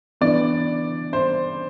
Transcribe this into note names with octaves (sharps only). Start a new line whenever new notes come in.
E3 B3 D4 D5
C5